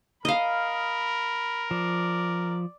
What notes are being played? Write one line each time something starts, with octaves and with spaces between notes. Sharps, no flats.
A#4 D#5 F5 B5
F3 D5